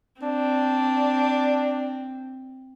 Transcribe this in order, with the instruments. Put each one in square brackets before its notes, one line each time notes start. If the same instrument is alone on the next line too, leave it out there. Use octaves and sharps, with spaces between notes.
[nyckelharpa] C4 [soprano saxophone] D4